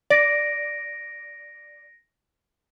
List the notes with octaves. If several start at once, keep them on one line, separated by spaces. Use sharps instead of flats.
D5 A#6 D7